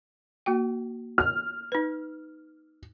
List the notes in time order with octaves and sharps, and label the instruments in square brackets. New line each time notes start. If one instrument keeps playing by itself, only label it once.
[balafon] A#3 F#4 G5
[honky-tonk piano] F6
[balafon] D#4 B4